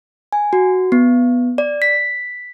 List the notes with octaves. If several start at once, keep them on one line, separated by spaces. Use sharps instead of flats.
G#5
F#4
B3
D5
B6